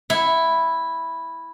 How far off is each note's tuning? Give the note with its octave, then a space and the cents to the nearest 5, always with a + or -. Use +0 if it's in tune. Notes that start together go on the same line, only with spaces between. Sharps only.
E4 -5 F#5 -5